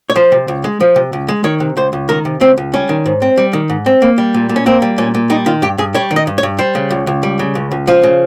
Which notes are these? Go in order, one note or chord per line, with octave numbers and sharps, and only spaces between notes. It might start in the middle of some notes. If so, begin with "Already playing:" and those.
C#5
F3 C5
C3
C#2
G#3
F3
C3
C#2
G#3
D#3 C#5
C3
C#2 C5
C#2
D#3 A#4
C3
C#2 C4
C#2
G3 C#4
D#3
G#2
C4
G3
D#3
G#2
C4
A#3
G3
A#2
A#2
C#4
A#3 C4
G3
A#2 C#4
A#2
G3 D#4
D#3 F4
G2 G4
G2 G#4
G3 C#5
D#3
D#5
G2
C#5
G2
G3 C5
C#3
C#2
C#2
G3
C#3
C#2
C#2
F3 F4
C#3